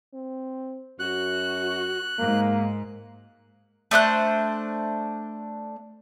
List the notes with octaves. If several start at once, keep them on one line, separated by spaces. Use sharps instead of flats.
C4
F#2 F#4 F#6
G#2 A#3
A3 D4 C5 F#6